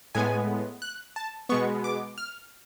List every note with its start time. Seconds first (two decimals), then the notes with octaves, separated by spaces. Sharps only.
0.15 A2 G#3 B3 G#5
0.82 F#6
1.16 A5
1.49 B2 G#3 B3 C#6
1.84 D6
2.18 F6